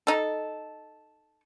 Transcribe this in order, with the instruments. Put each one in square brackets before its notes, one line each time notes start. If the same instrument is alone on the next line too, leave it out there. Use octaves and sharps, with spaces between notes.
[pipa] D#4 A4